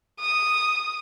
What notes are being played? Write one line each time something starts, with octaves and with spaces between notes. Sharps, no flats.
D#6